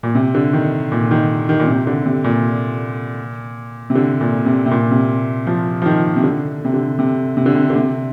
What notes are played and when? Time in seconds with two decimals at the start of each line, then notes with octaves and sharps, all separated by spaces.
0.03 A#2
0.15 C3
0.35 D3
0.53 D#3
0.92 A#2
1.11 D#3
1.49 D#3
1.59 A#2
1.67 C3
1.87 D3
2.06 C3
2.24 A#2
3.90 C3
3.95 D3
4.21 A#2
4.45 C3
4.66 C3
4.71 A#2
4.91 C3
5.47 F3
5.82 F3
5.86 D#3
6.16 C3
6.24 D3
6.65 C3
6.74 D3
6.99 C3
7.37 C3
7.46 D3
7.55 C3
7.70 D3
7.76 C3